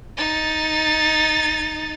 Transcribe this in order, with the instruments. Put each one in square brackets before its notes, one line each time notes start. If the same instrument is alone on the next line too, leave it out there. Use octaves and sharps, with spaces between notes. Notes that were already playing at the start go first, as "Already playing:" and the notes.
[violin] D#4 A6